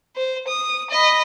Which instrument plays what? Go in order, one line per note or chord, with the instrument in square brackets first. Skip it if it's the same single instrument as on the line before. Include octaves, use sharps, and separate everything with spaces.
[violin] C5
D#6
D#5 B5